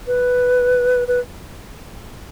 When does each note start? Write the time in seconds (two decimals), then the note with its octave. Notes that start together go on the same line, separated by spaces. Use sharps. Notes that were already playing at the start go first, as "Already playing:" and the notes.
0.07 B4
1.08 B4